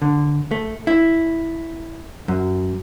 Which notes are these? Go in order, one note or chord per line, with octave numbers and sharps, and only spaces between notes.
D3
A3
E4
F#2